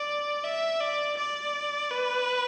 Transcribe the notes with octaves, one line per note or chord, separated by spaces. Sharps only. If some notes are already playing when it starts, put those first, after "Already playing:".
Already playing: D5
E5
D5
D5
B4